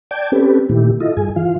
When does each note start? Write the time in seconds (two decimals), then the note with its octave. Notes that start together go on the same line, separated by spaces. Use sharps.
0.11 D5 G5 A5 D6 G6 G#6
0.32 C4 C#4 G4 A4 B4
0.69 A#2 D#3 A3 E4 G4
1.00 E4 F4 A4 D#5
1.17 G2 G#4 G#5
1.36 E3 F4 F5